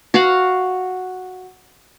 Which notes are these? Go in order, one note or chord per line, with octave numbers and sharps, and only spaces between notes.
F#4 F5 F#5